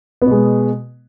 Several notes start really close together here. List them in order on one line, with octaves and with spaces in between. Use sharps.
B3 B2 G#3